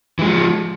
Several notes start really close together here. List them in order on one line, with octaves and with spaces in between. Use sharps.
E3 G#3 F3